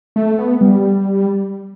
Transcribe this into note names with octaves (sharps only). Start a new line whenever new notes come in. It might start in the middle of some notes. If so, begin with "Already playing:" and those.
A3
B3
G3